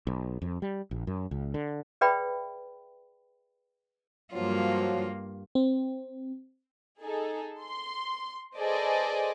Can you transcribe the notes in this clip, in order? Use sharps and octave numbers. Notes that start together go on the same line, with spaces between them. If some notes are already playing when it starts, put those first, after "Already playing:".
B1
F2
G3
A#1
F#2
C#2
D3
G#4 B4 D5 E5 G5 B5
G2 F3 F#3 A#3 F4
C4
D#4 G#4 A4
C6
G#4 A4 B4 C5 D5 D#5